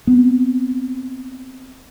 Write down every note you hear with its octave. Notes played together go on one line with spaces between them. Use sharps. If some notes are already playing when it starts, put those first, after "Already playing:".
B3 C4